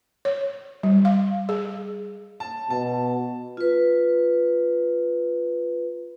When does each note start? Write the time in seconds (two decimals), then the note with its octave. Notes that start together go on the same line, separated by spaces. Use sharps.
0.25 C#5
0.83 G3
1.05 F5
1.49 G#4
2.40 A5
2.70 B2 A5
3.57 F4 B4